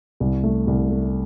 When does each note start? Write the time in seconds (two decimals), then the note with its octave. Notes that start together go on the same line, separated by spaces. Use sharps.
0.20 C2
0.43 A3
0.67 C2
0.90 A3